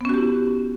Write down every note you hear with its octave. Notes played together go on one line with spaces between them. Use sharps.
B3 C#4 E4 F#4 G4